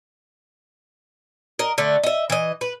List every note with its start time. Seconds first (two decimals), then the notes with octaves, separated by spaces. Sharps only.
1.59 A#4 D#5
1.78 D3 A3
2.03 D#5 E5
2.30 E3 D#5
2.61 B4